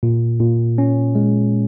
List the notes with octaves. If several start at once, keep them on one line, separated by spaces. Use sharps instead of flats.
A#2
A#2
C#4
G#3